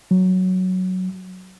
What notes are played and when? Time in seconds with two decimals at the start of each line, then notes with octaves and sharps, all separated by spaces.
0.11 F#3